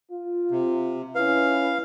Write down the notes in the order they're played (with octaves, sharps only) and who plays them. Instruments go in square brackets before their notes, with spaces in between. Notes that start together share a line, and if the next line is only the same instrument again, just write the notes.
[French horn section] F4
[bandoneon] C3
[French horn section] C#4 E4 B4 [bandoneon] F5